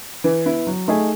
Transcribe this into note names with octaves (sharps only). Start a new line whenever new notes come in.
E3
B3 E4
F#3
A3 D#4 G#4